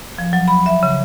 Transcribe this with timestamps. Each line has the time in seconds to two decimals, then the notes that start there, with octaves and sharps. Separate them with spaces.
0.18 F3
0.33 F#3
0.48 B5
0.66 E5
0.83 C#3